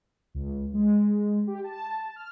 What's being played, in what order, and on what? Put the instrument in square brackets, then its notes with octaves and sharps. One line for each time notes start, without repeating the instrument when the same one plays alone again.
[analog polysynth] C#2
G#3
G4
A5
F6